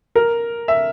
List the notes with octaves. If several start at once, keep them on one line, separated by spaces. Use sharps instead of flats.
A#4
E5